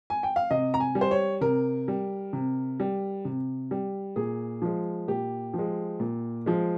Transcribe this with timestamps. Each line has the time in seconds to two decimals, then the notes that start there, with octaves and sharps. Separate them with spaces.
0.10 G#5
0.23 G5
0.36 F5
0.51 C3 D#5
0.74 A#5
0.80 G#5
0.95 G3
1.01 C5
1.11 C#5
1.41 C3 A#4
1.88 G3
2.33 C3
2.80 G3
3.25 C3
3.71 G3
4.16 A#2 G#4
4.62 F3 G#3
5.08 A#2 G4
5.54 F3
5.59 G#3
6.00 A#2
6.46 F3 G#3